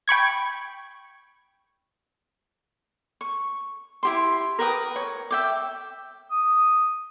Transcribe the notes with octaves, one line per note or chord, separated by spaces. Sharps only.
G5 B5 C#6 G#6
C#6
E4 G4 C6
A#4 B4 G5 D#6
C#5
E5 G5 D6
D#6